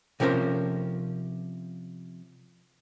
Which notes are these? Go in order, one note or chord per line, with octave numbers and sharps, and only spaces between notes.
C3 F3 C#4 A#4 C5